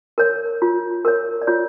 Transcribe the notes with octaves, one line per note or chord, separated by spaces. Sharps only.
A#4 C#5
F4
A#4 C#5
D5
F4 C#5